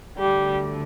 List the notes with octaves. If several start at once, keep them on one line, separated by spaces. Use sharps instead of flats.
D2 D3 G3 G4